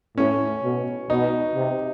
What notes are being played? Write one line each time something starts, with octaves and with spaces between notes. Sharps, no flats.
A2 C#4
B2
B2 D#4
C3